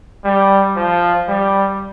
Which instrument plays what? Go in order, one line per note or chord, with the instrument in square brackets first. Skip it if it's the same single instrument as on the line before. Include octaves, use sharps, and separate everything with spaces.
[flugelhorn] G3
F3
G3